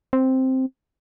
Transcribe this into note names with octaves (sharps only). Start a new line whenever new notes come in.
C4